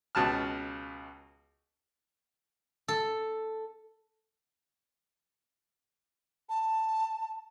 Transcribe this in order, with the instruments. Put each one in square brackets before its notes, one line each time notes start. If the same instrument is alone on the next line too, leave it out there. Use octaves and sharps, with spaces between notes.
[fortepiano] C#2 B2 A5 F6
[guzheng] A4
[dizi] A5